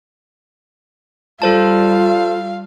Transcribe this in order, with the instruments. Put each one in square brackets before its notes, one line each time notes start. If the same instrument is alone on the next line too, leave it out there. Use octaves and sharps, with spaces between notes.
[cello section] G3 [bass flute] F4 [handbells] A4 C5 A5 [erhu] F5